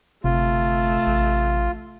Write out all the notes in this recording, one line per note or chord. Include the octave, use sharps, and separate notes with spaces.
G1 C3 A3 F4
A1